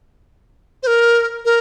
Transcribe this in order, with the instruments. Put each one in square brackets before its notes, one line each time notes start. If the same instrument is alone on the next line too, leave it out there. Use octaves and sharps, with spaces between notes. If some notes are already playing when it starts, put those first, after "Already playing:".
[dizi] C5
A#4
A#4